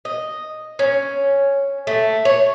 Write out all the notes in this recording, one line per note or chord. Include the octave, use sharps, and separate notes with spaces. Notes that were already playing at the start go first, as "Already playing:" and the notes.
D#5
C#4
A3
C#5